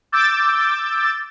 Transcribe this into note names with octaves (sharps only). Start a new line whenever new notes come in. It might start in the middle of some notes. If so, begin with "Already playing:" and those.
D6 E6 G6 A6